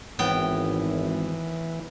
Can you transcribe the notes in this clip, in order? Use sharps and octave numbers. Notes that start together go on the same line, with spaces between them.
G#1 A2 E3 B3 G5